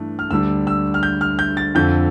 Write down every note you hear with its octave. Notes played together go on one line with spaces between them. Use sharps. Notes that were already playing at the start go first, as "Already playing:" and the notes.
Already playing: G2 E3 A3 D4
F6
D2 D3 G3 D4 E6
E6
F6
G6
F6
G6
A6
F2 D3 F3 G6